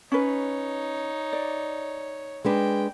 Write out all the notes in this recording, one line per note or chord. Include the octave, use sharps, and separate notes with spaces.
C#4 D#4 B4 C#5
D5
G#3 D4 B4 G5